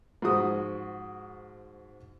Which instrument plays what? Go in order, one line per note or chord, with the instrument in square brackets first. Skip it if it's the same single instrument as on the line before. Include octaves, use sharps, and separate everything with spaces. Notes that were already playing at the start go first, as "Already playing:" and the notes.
[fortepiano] G#2 F3 F#4 D#6